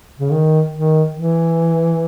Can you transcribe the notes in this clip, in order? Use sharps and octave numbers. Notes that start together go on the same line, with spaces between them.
C#3
D#3
D#3
E3